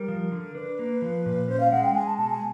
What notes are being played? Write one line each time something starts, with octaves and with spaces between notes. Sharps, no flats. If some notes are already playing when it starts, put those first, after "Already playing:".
Already playing: G3 A#4
F3
D3
D4 B4
A#3
F3
A#2
C#4 C5
F5
G#3 F#5
G5
G#3 G#5
A5
B2 A5
G#5